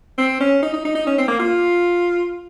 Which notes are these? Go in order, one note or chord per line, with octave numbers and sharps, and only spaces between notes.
C4
C#4
D#4
D#4
D#4
D#4
C#4
C4
A#3
F4